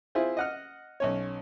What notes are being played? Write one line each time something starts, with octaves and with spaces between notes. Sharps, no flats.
C4 E4 F4 G#4 C5
D#5 F#5 F6
B1 C#4 C#5